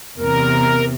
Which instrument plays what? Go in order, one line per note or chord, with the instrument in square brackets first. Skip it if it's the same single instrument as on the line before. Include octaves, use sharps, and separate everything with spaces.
[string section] E2 C3 [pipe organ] A#4